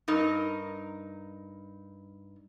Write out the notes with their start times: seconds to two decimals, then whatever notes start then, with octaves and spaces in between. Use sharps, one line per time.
0.08 G2 D#4 A#4